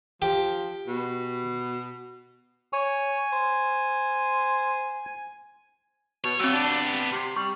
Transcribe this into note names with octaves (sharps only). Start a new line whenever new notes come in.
F3 G4
B2
C#5 G#5
C5
B2 C#5
F#3 B3 C4 G4 E6
D4
C3
G3 C#6